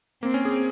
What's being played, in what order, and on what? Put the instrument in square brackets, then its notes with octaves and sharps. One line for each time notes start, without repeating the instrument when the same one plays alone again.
[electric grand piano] A#3 [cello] C4
[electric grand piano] C#4
G#4